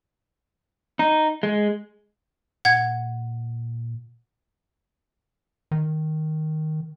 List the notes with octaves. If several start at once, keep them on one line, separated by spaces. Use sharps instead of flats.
D#4
G#3
A#2 F#5 G#6
D#3